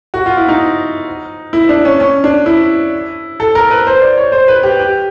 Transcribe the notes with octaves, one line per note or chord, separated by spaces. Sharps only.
F#4
F4
E4
D#4
E4
D4
C#4
C#4
D4
E4
A4
A#4
B4
C5
D5
C#5
C5
B4
G4
G4